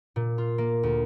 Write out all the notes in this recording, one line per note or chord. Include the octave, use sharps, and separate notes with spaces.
A#2
F4
A#3
D2